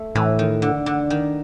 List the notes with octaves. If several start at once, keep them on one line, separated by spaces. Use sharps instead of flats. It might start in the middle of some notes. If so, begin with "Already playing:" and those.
Already playing: A3
A2 E3
D#3
D3
D3
D#3